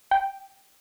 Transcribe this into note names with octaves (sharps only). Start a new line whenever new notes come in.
G5